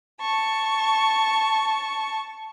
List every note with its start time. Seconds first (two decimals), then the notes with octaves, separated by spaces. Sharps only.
0.21 A5 C#6